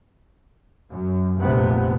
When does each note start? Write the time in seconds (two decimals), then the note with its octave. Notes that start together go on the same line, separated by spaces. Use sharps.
0.90 F#2
1.40 F1 A#1 C3 B3